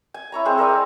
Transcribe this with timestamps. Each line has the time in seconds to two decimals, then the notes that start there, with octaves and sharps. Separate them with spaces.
0.14 G#5
0.32 E4 C#5 A#5
0.45 G#3 C4 C5
0.57 A4 A#4 D5 G#5
0.69 C5